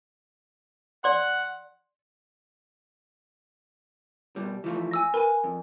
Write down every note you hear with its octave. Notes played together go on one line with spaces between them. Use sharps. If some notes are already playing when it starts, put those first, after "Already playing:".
D5 F#5 C6
B2 G3
E3 F3 A3
G#5 E6 A#6
A#4 B4 G#5
F2